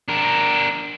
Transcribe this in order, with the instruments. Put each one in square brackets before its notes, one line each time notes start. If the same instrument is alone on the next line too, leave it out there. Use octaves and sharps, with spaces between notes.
[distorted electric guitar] D4 A#4